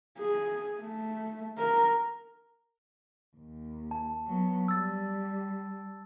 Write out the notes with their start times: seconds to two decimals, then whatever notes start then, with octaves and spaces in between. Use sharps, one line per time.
0.19 G#4
0.80 A3
1.58 A#4
3.36 D#2
3.91 A5
4.26 F#3 B3
4.68 G3 E6 A6